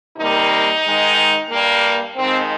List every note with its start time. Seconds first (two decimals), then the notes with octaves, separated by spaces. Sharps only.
0.18 C3 D#3 G3 A#3 D#4
0.84 G#2 D#3 G#3
1.50 G2 G3 A#3
2.17 F2 D#3 G#3 C4